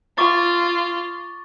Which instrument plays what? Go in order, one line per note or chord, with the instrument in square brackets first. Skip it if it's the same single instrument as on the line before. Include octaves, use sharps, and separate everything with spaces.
[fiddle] F4 [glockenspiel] C#6 D6 A6